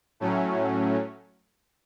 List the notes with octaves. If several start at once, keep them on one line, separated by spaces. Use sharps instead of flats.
A2 F#3 A3 C#4